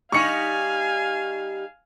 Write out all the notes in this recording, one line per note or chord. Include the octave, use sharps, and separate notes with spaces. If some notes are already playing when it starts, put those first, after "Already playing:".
G3 D#4 F5 G#5 C#6 C#7